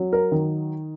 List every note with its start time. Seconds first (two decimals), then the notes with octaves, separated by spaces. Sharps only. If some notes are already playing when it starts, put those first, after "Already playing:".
Already playing: F#3
0.13 A#4
0.32 D#3